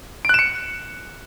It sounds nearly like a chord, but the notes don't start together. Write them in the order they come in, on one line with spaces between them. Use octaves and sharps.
D7 F#6 E7 C#7